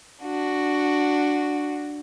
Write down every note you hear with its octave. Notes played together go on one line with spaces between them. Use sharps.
D4 F#4